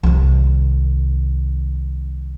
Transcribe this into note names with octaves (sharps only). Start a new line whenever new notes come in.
C2 D#3